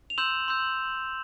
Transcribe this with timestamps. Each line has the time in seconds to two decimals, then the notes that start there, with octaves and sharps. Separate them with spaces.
0.10 F7
0.18 C6 E6 G6 E7 F#7
0.48 C6 E6 G6